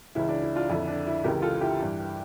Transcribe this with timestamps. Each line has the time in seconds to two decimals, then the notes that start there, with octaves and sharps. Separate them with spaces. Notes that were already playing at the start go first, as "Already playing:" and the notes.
0.15 C#2 C#3 E3 E4
0.29 D4
0.42 E4
0.56 D4 F4
0.69 F2 D3 E4
0.88 D4
1.07 E4
1.24 C#2 C#3 E3 G4 A#4
1.42 F4 A4
1.61 E4 G4
1.79 G2 E3